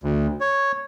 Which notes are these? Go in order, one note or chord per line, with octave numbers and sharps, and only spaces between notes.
D2
C#5